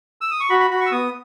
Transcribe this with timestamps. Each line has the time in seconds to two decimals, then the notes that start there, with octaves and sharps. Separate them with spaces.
0.21 E6
0.31 D#6
0.40 C#6
0.50 F#4 B5
0.60 B5
0.71 F#4 B5
0.81 C#6
0.86 E6
0.91 B3 D#6